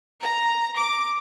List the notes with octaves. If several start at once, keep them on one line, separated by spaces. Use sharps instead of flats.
A#5
D6